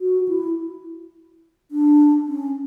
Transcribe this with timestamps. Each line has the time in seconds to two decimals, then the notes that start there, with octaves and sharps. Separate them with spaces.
0.01 F#4
0.28 E4
1.71 D4
2.28 C#4